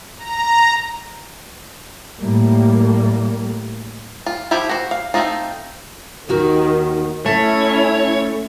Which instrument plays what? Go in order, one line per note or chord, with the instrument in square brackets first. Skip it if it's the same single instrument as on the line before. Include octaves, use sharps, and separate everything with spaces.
[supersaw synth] A#5
[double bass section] A2 G3 A#3
[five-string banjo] F4
F3 E4 F4 G4
F#4 C5
F5
A3 C4 D#4 F4
[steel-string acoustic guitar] D#2 F#4 A#4 [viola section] D#3
[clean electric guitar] A3 [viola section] C#4 E4 [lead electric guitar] C#5 [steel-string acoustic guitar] A5